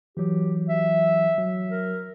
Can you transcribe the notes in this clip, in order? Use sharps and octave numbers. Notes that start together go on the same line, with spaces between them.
E3 F#3 G4
E5
F#3
A#4